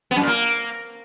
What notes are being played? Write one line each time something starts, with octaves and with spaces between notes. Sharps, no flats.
B3
F#2
A#2
A#3